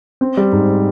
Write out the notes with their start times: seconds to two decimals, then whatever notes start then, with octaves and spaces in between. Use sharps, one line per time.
0.21 C4
0.37 G3
0.52 G#2